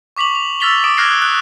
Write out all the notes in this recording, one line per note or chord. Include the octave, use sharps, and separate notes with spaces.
C#6 D6 B6 F7 F#7
F7
E6 F6 A6 B6 F7 G7
D6 D#6 D7 E7
D6 F6 F#6 G#6 A#6 C7
F#6